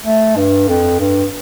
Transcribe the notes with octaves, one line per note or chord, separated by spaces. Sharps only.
A3
G2
F2
G2